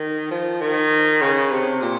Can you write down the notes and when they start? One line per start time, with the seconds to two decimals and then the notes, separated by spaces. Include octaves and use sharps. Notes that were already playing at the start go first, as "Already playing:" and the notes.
Already playing: D#3
0.31 F3
0.61 D#3
1.22 C#3
1.52 C3
1.82 A#2